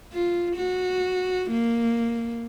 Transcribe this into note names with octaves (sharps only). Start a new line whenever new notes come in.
F4
F#4
A#3